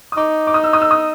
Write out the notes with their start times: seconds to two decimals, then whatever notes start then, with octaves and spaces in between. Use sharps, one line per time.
0.12 D#6
0.17 D#4 D6
0.47 D6
0.54 D#6
0.64 E6
0.73 D#6
0.81 E6
0.91 D#6